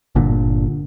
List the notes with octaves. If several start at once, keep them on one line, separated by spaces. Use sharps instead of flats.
G1 A#2 D3